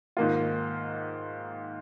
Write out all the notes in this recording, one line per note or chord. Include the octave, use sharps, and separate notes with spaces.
G#2 D#3 A#3 F4